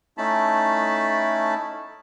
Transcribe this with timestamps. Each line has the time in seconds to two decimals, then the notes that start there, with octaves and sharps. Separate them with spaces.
0.18 A3 C#4 D#4 E4 A5 B5